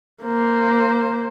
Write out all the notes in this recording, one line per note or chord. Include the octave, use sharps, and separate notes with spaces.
A#3 C5